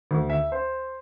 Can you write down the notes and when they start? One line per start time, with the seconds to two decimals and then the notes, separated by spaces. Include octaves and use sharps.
0.11 D2
0.30 E5
0.52 C5